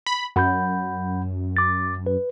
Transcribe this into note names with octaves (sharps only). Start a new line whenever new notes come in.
B5
F#2 F#5 B5 G6
D6 A6
B4